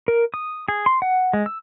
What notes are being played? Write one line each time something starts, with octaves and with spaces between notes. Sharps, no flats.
A#4
D#6
G#4
C6
F#5
G#3
E6